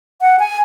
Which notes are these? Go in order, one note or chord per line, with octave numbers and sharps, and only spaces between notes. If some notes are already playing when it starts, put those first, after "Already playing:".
F#5
G#5